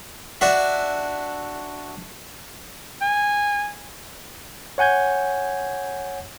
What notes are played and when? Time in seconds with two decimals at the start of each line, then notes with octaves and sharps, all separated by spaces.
0.41 D4 F#4 E5
3.01 G#5
4.78 C#5 F#5 G#5 G6 G#6